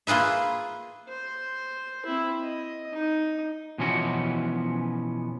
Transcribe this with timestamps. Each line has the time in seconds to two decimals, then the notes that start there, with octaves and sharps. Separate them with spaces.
0.07 A#3 F4 G#4 B4 E5
1.08 C5
2.06 C4 E4
2.43 D#5
2.93 D#4
3.78 B2 E3 F3 B3 C#4 F#4